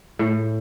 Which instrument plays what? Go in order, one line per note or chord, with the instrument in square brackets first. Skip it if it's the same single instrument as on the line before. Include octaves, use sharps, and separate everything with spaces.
[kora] A2